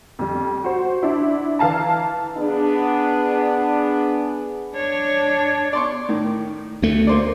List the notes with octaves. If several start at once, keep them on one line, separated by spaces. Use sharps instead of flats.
F2 G3
F#4 C5
D4 E4
E3 F5 A5 A#5
B3 D4 G#4
D4 C#5
D5 C6 C#6
A2 D#3
D2 A3
A#3 C5 D5